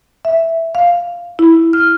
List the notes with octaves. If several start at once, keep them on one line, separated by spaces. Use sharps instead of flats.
E5
F5
E4
F6